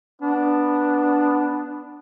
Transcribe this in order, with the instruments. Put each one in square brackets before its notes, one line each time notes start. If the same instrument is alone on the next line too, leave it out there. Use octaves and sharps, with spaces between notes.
[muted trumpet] B3 [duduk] D4